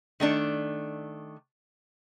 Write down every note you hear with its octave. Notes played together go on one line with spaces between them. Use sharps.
D#3 A3 D4 D5